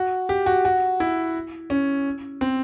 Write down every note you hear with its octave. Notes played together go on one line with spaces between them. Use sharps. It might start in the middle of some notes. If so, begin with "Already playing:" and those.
Already playing: F#4
G4
F#4
F#4
E4
C#4
C4